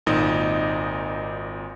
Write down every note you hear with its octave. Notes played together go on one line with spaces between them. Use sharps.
G#1 A#2 D#4 D#5